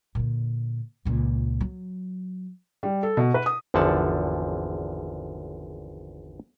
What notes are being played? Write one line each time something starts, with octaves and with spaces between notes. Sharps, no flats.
A#2 D3
C#2 A#2
F#3
G3
A4
B2
B4
D#6
G#1 E2 D3 F3 F#5 A5